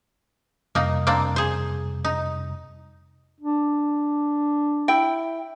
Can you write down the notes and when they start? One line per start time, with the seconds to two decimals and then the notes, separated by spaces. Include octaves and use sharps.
0.75 F2 C3 G3 A#3 D#4
1.07 A#3 C4 D4
1.36 G#4 C5
2.05 D#4
3.41 D4
4.88 E4 G5